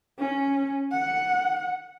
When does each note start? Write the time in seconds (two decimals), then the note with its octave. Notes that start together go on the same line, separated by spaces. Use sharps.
0.19 C#4
0.92 F#5